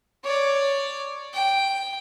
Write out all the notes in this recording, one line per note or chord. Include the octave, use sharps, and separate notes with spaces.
C#5 D5
G5